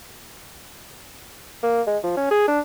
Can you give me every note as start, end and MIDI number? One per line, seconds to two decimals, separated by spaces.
1.63 1.82 58
1.87 1.98 56
2.04 2.13 53
2.17 2.26 61
2.31 2.47 68
2.48 2.60 62